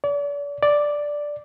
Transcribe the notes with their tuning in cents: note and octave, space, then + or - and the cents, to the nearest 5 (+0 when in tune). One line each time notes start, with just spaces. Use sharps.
D5 -40
D5 +0